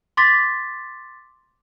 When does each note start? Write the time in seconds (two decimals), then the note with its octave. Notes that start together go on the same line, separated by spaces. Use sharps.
0.17 C6 D6 A6 B6